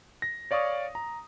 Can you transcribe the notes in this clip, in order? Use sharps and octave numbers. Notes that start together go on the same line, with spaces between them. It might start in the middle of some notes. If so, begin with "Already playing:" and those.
A#6
C#5 D5 F5 C#6 D#6
A#5